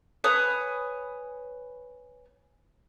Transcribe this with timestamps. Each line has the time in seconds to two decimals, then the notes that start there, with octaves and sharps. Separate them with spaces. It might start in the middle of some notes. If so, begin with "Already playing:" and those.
0.24 B4 C#5 G#5 D#6